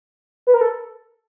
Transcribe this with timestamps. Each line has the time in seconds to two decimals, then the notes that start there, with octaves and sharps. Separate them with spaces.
0.47 B4
0.54 A#4
0.61 A4